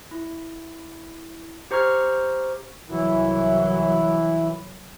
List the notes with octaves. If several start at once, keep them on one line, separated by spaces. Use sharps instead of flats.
E4
G4 C5 A#5 C#6 F6 G#6
C2 E3 F#3 E4